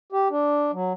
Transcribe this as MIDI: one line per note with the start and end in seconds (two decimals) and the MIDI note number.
0.12 0.28 67
0.30 0.71 62
0.73 0.93 54